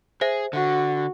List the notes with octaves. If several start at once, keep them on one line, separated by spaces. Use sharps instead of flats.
G#4 C5 E5
D3 F#4